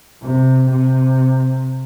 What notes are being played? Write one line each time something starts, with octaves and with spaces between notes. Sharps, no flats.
C3
C3